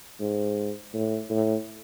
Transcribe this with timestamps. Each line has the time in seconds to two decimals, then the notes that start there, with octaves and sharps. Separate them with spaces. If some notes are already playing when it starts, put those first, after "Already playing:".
0.21 G#2
0.93 A2
1.30 A2